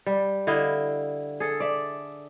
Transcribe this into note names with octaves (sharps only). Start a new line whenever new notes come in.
G3
D3 E4 D#5 F5
G#4 A4
D5 E5